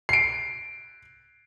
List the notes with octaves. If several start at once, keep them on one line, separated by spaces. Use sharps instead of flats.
C7 D7